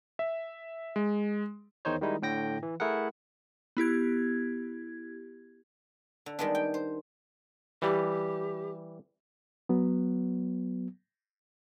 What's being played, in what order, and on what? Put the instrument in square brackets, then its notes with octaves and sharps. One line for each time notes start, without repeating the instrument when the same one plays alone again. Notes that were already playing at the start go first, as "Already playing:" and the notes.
[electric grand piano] E5
G#3
[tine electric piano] E2 D#3 D#4 C5 C#5
D#3 G3 G#3 D#4 E4
A2 D3 G5 A#6
E3
A3 E4 G#4 A#4 F#5
[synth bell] B3 E4 G4 G#6
[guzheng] D3
D#3 G3 G#3 B3 D4
G5
C5
[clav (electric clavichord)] E3 G3 [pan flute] G4
[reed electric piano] F#3 B3